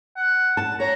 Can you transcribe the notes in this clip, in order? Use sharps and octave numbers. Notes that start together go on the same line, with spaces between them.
F#5
A5
C#5 A#5